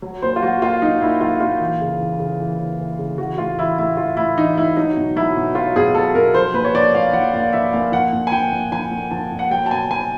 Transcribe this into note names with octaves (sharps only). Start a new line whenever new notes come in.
F#3
A#2 C5
F4
F#3 F#4
A#2 F4
F#3 D#4
A#2 E4
F#3 F4
A#2 F4
E3
C#3
E3
C#3
E3
C#3
E3
C#3
E3 F#4
A2 F4
E3 E4
A2 E4
E3 F4
A2 E4
E3 D#4
A2 E4
F#3 D#4
B2
F#3 E4
B2
F#3 F4
B2 G#4
F#3 A4
B2 A#4
F3 C5
A#2 B4
C#5
F3 D5
A#2 F5
F3 F#5
A#2 F5
F3 E5
A#2 F5
F3 F#5
A#2
G#5
F3 G5
A#2
F3 G#5
A#2
F3 A5
A#2
F#5
F#3 G5
A5
B2 G#5
F#3 G#5